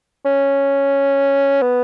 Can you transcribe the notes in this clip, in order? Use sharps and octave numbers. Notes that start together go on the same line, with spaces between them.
C#4
B3